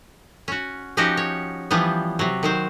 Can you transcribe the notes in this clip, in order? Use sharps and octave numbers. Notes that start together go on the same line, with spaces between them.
C#4 F#4
F3 C#4 D#4 F#4 G4 D#5
C#5
E3 F3 G3 B3
C3 F#3
D#3 F#3 C5